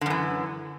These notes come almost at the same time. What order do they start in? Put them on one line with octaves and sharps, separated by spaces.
D3 F#2 E3